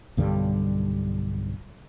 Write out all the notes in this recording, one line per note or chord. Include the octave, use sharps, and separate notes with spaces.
B1 G2 D3 G3